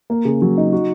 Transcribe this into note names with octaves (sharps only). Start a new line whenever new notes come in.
A#3
C#3
F#3
D#4
F#4